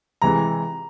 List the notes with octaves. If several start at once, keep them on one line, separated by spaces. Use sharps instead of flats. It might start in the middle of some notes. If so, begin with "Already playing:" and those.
C3 E3 G#3 A#5